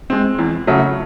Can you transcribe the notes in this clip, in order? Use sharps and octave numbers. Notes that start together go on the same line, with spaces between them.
G#3 C4
E2
C#3 F#3 A3